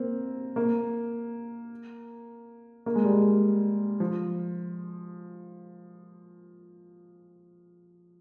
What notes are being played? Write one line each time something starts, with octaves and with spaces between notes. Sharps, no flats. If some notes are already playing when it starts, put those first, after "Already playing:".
Already playing: A#3 C4
A#3
A#3
G#3
G3
G#3
F3